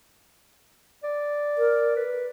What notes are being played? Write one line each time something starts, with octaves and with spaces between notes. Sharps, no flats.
D5
A#4
B4